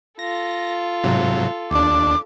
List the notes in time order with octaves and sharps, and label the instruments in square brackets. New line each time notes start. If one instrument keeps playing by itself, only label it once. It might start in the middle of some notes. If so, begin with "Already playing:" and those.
[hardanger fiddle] F4 A4 [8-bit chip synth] A#6
[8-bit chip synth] G#2 C3 F#3
[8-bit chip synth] D#2 D4 [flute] D6